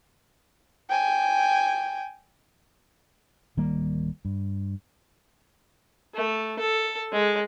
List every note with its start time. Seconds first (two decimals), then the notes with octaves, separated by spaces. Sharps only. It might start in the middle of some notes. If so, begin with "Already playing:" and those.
0.89 G5 G#5
3.57 D1 D#3 G3 A#3
4.25 G2
6.14 A3
6.59 A4
7.12 G#3